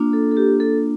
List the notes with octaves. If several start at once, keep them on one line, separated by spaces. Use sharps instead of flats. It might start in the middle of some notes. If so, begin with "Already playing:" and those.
Already playing: A#3 D4 F4
A4
A4
G4
A4